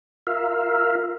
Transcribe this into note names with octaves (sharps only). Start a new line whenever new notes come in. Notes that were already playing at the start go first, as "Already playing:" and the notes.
F4 A#4 E5 F5